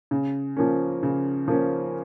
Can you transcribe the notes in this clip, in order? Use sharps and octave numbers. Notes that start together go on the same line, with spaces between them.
C#3
F3 A#3 C#4
C#3
F3 A#3 C#4